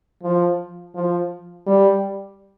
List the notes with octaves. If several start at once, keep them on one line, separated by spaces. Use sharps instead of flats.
F3
F3
G3